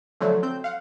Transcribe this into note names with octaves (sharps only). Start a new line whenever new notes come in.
D3 F3 F#3 A3
C4 G6
F5 F#5